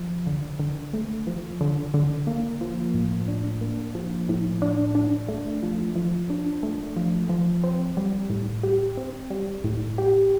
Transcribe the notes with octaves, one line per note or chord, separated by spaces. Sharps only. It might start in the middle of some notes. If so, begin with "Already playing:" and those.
Already playing: F3
D3
D3
A3
F3
D3
D3
A#3
F3
A2
D4
A#3
F3
A2
D4
D4
A3
F3
F3
D4
A3
F3
F3
C4
G3
A2
G4
C4
G3
A2
G4